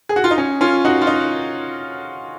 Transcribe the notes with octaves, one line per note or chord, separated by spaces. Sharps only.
G#4
F#4
F4
D#4
C#4
C#4 F4
D#4 F#4
F4
D#4